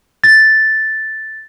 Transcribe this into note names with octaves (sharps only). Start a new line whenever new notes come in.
A6